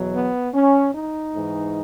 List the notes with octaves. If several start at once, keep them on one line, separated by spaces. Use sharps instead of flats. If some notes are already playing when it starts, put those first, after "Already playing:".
Already playing: E2 B2 F#3
B3
C#4
D#4
G#2 E3